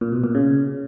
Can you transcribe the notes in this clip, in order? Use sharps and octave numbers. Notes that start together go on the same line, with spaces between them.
A#2
B2
A#2
C#3